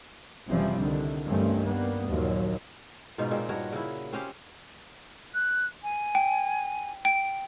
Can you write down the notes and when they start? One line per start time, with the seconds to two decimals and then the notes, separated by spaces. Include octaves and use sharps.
0.48 F#1 C3 E3 F3 G3 C4
0.77 C2 D3 D#3
1.25 G2 D#3 E3 A3 C4 C#4
1.64 G3 A#3 B3
2.09 D#2 A#2 F3 F#3
3.18 G#2 B2 D#4 F4
3.31 A#2 G#3 C4
3.49 G2 F#4 A#4 C#5
3.72 C#3 E4
4.12 C4 C#4 G4 F5
5.34 F#6
5.83 G#5
6.15 G5
7.05 G5 D7